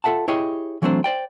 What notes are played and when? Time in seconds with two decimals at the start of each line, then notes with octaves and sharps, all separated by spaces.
0.04 F4 A4 E5 F#5 A5
0.28 E4 G4 G#4 C#5 D#5 G5
0.82 E3 F#3 A3 C4 D4 C5
1.04 C5 D5 G5